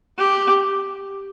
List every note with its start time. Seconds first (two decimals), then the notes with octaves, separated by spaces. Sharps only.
0.18 G4